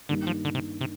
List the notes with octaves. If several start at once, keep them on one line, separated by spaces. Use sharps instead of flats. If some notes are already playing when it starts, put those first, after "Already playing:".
G2 D3 D#3 G3 A#3 D#4
F3
D3
C3
C3